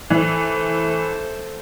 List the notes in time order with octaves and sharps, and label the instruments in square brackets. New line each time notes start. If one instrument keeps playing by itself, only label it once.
[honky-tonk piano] E3 [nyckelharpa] A3 C5